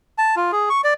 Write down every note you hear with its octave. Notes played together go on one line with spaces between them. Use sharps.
A5
F4
G#4
C#6
D5